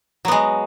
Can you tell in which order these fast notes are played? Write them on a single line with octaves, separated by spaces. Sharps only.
F#3 B3 G#3